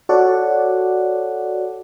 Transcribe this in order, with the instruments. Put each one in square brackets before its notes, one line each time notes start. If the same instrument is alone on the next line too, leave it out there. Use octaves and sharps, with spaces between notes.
[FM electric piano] F#4 A4 C#5 D5 F#5